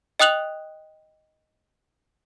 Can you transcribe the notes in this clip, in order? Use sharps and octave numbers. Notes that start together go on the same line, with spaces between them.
D#5 G5 D#6 F#6 F7 F#7